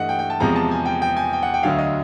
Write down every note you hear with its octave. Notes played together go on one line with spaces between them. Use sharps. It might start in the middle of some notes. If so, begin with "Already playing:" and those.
Already playing: G2 E3 A3 D#5 F#5
G5
G5
A5
E2 C3 F3 G#3 A#5
A5
G#5
G5
G5
G#5
G5
F#5
G5
D2 D3 F#3 F5
D#5